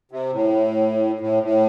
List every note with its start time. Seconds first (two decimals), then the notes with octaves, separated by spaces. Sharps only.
0.11 C3
0.33 A2
1.21 A2
1.43 A2